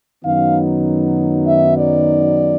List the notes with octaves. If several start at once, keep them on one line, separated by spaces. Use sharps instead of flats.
F#2 D#3 F#3 B3 D#4 F5
E5
D5